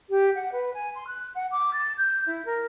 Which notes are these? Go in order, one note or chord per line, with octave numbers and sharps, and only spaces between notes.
G4
F#5
B4
G#5
C6
F#6
F#5
D6
A6
G6
E4
A#4